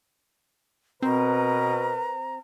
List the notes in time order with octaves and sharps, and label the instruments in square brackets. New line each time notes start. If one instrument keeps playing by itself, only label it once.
[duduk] B2 [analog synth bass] C4 [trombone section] A#4 B4 [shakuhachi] A#5